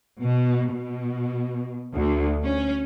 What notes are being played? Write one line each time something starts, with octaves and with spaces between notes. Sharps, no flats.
B2
B2
D2
C#4